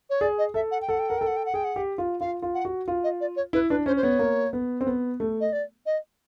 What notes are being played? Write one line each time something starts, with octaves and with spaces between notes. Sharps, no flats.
C#5
G#4 D5
D#5
A4 E5
F#5
G5
A4 F#5
G5
A#4 F#5
A4 G5
F#5
G5
F#5
G#4 G5
F#5
G4
F4
F4 F5
F4
F#5
F#4
F4
D#5
D5
C#5
E4 B4
D4 B4
C#4 C5
C5
B3 C#5
A#3
B3
C4
B3
A3
D#5
D5
D#5